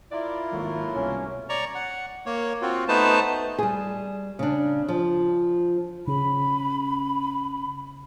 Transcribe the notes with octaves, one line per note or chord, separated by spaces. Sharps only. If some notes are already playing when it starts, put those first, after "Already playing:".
E4 F4 A#4 D5 E5
G#1 F#3 A3 A#3 C#6
C2 B2 C#4
C#5 D5 A#5 C#6
F#5
A#3 C#5
C4 F4 F#4
A3 B3 D#4 B4 C5 A5
G3 G#4
C#3 D4
F3
C#3 B5